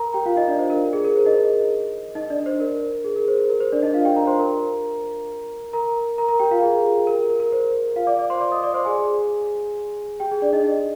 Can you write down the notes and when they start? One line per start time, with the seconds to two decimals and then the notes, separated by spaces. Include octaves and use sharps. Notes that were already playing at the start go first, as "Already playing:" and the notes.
Already playing: A#4 A#5
0.14 G4 G5
0.26 F4 F5
0.36 D#4 D#5
0.48 D4 D5
0.59 C5
0.70 A#4
0.93 G#4
1.04 A#4
1.16 C5
1.26 D#4 D#5
2.15 D#4 D#5
2.30 D4 D5
2.46 C5
2.60 A#4
3.04 G#4
3.16 A#4
3.28 C5
3.50 A#4
3.60 C5
3.72 D4 D5
3.83 D#4 D#5
3.94 F4 F5
4.05 G4 G5
4.16 A#4 A#5
4.27 C5 C6
4.39 A#4 A#5
5.73 A#4 A#5
6.18 A#4 A#5
6.28 A#4 A#5
6.39 G4 G5
6.51 F4 F5
6.62 G#4
7.07 A#4
7.30 A#4
7.40 A#4
7.52 C5
7.96 F4 F5
8.07 D5 D6
8.19 D5 D6
8.30 C5 C6
8.41 D5 D6
8.52 D#5 D#6
8.63 D5 D6
8.74 C5 C6
8.85 G#4 G#5
10.20 G4 G5
10.31 G#4
10.42 D4 D5
10.53 D#4 D#5
10.64 D#4 D#5